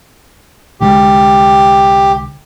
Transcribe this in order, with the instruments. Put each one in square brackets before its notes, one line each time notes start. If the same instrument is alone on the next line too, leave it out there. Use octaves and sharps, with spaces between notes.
[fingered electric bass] C2 D3 G#3 [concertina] G4